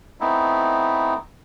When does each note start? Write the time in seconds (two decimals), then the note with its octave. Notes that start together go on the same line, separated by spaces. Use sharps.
0.20 A3 B3 C4 D#4 E4